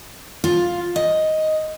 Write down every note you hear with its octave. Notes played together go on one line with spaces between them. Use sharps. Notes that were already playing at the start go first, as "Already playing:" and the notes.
F4
D#5